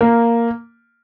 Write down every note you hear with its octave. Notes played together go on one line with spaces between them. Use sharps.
A#3